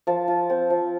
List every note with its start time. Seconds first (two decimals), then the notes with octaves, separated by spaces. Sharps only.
0.07 F3 A5
0.28 F4
0.50 C4
0.70 F3